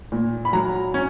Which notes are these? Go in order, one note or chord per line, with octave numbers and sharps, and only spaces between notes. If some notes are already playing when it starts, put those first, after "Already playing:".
A#2
B5
F#3 A#5
C#4